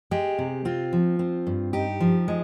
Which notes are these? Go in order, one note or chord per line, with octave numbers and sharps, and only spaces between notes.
G#3 G4
C3
C4 F4
F3
C4
G2
D#4 G4
F3
G#3